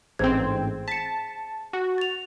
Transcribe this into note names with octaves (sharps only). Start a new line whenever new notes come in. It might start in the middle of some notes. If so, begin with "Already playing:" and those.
A1 G#2 C4 G#4 C5 G#6
A5 B6 C#7
F#4
A6 F7